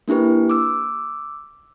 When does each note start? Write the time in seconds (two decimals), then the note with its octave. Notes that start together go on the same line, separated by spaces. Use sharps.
0.08 A#3 D4 E4 G4 B4
0.50 D6 E6